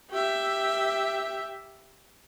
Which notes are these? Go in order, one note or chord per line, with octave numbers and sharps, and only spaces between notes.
G4 E5